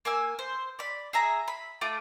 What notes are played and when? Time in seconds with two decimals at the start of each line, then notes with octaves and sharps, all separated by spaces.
0.05 A#3 G#5 E6
0.39 C5
0.79 D5 B5
1.13 G#4 E5 A#5
1.48 B5
1.81 A3 F4 D6